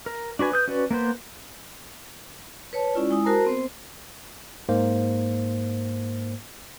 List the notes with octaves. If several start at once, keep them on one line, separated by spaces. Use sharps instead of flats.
A#4
D4 F#4 B4 G#5
B4 D#6 G6
C#4 F#4 B4 D5
A#3 B3 B4 C5
B4 C#5 A5
G#3 C#4 E4 F4 D5
G#3 E4 G#5 D#6
F#4 A#4 C5 A5 A#5
B3 C4 C5
G#2 A#3 C5